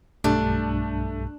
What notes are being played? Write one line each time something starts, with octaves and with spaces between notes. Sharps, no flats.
B1 G2 G3 A3 D4